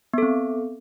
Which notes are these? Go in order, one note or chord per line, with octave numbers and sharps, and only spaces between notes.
B3 C4 A4